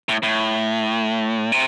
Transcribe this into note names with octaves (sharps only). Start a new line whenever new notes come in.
A2
A2
C3